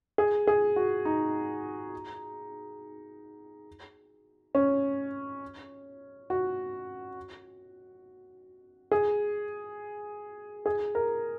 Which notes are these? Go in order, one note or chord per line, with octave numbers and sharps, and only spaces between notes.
G#4
G#4
F#4
D#4
C#4
F#4
G#4
G#4
A#4